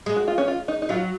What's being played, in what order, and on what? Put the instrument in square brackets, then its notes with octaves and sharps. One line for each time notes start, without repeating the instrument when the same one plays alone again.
[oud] G#3
[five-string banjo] F#4
F4
C#4
F4
D#4
D#4
[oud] F#3 [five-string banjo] F4